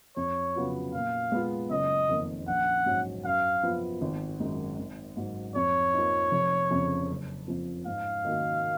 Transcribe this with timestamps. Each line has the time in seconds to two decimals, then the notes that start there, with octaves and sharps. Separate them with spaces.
0.17 F2 C#5
0.56 C#3 F#3 B3 F4
0.93 A#2 F5
1.32 G#3 B3 F4
1.70 F#1 D#5
2.09 F2 D#3 A#3
2.47 A#1 F#5
2.86 G#2 F#3 C#4
3.24 F#2 F5
3.63 F3 B3 F4
4.02 G#1
4.40 F#2 D#3 G#3 D#4
4.79 G#1
5.17 G#2 F#3
5.56 F2 C#5
5.94 F3 A#3 D#4
6.32 F1
6.71 F2 C#3
7.09 F#1
7.48 F2 F3
7.86 G#2 F5
8.25 D#3 A#3 D#4 F#4